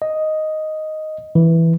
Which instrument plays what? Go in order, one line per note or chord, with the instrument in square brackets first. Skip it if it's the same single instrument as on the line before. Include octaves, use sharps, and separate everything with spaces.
[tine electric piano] D#5
E3